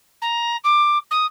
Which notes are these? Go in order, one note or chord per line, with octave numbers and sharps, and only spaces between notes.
A#5
D6
D#6